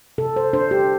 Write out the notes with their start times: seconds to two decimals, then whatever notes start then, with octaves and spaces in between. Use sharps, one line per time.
0.18 C3 A4
0.36 C5
0.53 D4 C5
0.71 G4